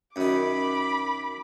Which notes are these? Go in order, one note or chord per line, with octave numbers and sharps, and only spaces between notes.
F#2 D#3 B5 D6